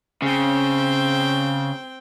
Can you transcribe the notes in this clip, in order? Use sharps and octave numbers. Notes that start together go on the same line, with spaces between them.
C#3 C4 G5